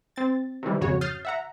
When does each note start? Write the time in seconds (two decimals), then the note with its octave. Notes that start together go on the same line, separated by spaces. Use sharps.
0.16 C4 A6
0.63 C3 D#3 E3 G3
0.81 G#1 F2 C#3 F#4 C#5
1.01 D#6 F6 G6 A6 C7
1.25 E5 F#5 A#5